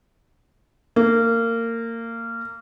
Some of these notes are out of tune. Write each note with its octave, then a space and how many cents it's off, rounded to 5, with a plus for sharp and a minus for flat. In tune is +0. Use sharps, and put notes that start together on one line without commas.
A#3 -25